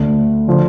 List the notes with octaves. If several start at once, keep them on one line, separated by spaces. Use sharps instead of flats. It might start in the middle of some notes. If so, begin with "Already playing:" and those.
Already playing: D2 D3 A3
D3 F3